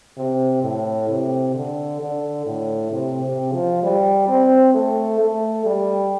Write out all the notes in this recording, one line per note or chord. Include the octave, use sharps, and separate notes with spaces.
C3
A2
C3
D3
D3
A2
C3
C3
F3
G3
C4
A3
A3
G3